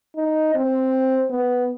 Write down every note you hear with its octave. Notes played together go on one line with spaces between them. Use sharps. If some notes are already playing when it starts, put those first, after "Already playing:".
D#4
C4
B3